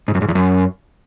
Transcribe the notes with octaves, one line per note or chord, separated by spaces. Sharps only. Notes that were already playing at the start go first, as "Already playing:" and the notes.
G#2
F#2
G#2
E2
F#2